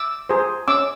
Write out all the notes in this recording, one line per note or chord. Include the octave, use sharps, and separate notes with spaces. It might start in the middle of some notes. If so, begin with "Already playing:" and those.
Already playing: D6 E6
G#4 C5
C#4 D6 E6